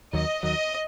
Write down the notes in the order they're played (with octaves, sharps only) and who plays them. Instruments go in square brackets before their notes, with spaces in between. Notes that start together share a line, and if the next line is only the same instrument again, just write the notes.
[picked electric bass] D#2 D#3 F#3 [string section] D#5
[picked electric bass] D#2 D#3 F#3 [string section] D#5